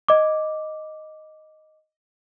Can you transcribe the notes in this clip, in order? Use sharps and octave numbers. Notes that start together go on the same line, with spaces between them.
D#5 D6